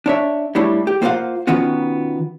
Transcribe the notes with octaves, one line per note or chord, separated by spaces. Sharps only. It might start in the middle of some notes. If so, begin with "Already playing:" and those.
D4 C#5 E5
G3 A3 D4 E4 C#5
G4
A#3 F4 C5 D5 F5 F#5
D#3 B3 C#4 F4 F#4